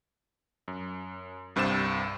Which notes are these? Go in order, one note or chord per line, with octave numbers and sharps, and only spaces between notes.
F#2
C2 G2 C3 C5 A6 E7